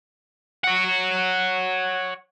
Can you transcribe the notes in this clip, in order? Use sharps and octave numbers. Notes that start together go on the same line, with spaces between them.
C#5 F#5